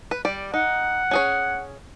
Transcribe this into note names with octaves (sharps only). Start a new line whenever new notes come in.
B4
G3 D5
D#4 F#5
C#4 G#4 C#5